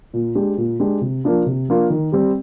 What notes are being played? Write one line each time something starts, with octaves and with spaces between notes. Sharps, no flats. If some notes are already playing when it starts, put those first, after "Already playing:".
A#2
G#3 D4 G4
A#2
G#3 D4 G4
C3
F3 A#3 D4 F4
C3
F3 A#3 D4 F4
D#3
G3 C4 G4